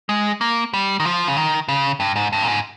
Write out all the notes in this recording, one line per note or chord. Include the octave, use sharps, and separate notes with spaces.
G#3
A#3
G3
D#3
F3
C#3
D#3
C#3
G2
G#2
G2
A#2
G#2